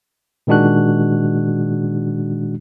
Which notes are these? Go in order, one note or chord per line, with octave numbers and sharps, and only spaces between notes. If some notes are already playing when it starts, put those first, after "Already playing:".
A#2 D#3 G#3 D4 F#4 F#6